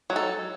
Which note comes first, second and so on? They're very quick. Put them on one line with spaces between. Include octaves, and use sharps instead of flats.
F#3 D#4 A4